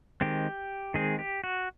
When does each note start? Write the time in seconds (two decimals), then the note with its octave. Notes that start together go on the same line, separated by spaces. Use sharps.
0.21 D#3 G#3 C4 G4
0.94 D#3 G#3 C4 G#4
1.19 G4
1.44 F#4